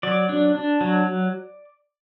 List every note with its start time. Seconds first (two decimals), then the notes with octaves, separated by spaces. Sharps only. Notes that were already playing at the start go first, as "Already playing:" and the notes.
0.03 F#3 D5
0.29 D4
0.55 D4
0.81 F#3